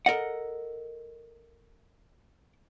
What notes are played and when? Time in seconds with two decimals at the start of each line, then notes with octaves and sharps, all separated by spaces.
0.06 A4 A#4 D#5 F#5